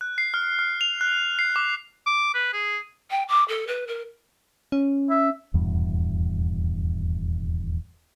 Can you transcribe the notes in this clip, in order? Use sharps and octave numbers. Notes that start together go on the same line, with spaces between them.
F#6
C7
F6
F6
F7
F#6
C7
D6
D6
B4
G#4
G5
D6
A4
B4
A#4
C#4
E5
D#1 E2 G2 B2